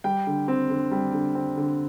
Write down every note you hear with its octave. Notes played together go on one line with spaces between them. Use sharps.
G3 G5
D3
C4
D3
G3
D3
C4
D3